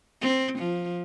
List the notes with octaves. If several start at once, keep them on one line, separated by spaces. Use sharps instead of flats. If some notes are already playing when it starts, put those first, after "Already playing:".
C4
F3